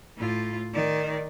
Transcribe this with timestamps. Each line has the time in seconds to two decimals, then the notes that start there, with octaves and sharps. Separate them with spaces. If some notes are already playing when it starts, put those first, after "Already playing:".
0.17 A2 F4
0.73 D#3 D5